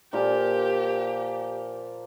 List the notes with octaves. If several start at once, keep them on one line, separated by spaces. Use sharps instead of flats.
A#2 F3 A#3 G4